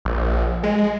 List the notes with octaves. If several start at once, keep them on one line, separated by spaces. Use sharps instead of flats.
A#1
G#3